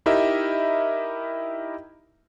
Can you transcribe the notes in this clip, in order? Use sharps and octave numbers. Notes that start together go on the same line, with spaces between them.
D#4 E4 G4 A#4 D#5 E5